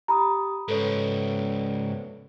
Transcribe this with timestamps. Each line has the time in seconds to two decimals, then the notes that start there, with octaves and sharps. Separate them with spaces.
0.08 G4 A#5 B5 D#6
0.68 G#2 C#3 A4 B4 C#5